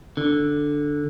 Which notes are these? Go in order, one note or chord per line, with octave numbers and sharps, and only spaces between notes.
D3